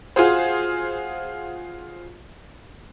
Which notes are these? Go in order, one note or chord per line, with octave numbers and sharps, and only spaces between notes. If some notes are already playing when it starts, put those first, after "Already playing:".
F4 F#4 G#4 C5